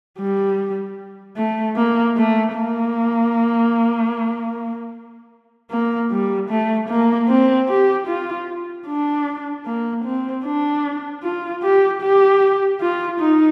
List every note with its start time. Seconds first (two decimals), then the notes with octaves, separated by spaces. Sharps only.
0.19 G3
1.37 A3
1.77 A#3
2.17 A3
2.55 A#3
5.71 A#3
6.11 G3
6.50 A3
6.89 A#3
7.28 C4
7.69 G4
8.08 F4
8.87 D4
9.66 A#3
10.05 C4
10.45 D4
11.23 F4
11.63 G4
12.02 G4
12.82 F4
13.20 D#4